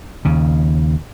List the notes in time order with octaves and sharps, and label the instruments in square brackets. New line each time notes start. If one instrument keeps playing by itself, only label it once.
[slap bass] D#2 C#3